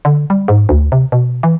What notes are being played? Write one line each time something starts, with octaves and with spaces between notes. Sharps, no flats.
D3
G3
G#2
D2
C3
B2
E3